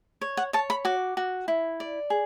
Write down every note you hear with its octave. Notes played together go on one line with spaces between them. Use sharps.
C#5
F#5
C#5 A5
B5
F#4 D6
F#4
E4
D5
G#4